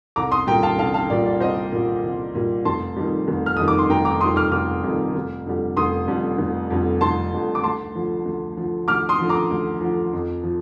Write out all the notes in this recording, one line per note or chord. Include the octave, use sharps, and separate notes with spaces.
C2 A#5 D6
C6 D#6
A#2 G3 G5 A#5
F5 A5
C2 F5 A5
F5 A5
A#2 G3 D5
D5
C2 C5 D#5
A#2 G3
C2
A#2 G3
F1 A5 C6
F2 D#3 G3
F1
F6
F2 D#3 G3 D#6
D6
C6
F1 G5 A#5
A#5 D6
F2 D#3 G3 C6 D#6
D6 F6
F1 D6 F6
F2 D#3 G3
F1
F2 D3 G3
F1 C6 D#6
F2 D3 G3
F1
F2 D3 G3
F1 A5 C6
F2 D3 G3
D6
D2 A5 C6
D3 F3
D2
D3 F3
D2 D6 F6
C6 D#6
D3 F3
A#5 D6
D2
D3 F3
F2
F3